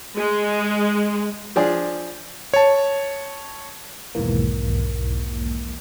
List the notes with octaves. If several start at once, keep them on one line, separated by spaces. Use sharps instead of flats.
G#3
F3 D4 G#4
C#5 A5
B1 E2 G#2 D#3 E3 A#3